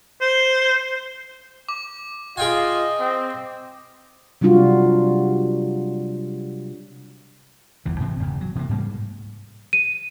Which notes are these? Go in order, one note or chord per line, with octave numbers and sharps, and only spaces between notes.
C5
D6
F4 G#4 D#5 G5 G#5
C4
C3 F#3 G3 D4 F4 F#4
G1 E2 E3
G#2 C3 E3 C4
E1 E2 C#3
F#3
C3 E3 F#3 A#3
G#2 G3 A#3
D#7